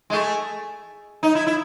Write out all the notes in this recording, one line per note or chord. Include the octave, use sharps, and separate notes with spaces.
G#3
A3
D#4
E4
E4